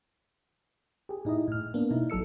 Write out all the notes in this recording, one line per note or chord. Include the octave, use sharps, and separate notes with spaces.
G4 G#4
A2 D#4 E4 D#5
A2 F6
A#3 B3 D4
B2 D#4 E4
G#1 F#3 A4 E6 C#7